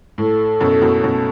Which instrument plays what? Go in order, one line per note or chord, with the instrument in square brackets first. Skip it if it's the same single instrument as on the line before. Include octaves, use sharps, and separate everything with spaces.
[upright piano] A2 [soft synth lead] A4
[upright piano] F#2 B2
F#2 B2
F#2 B2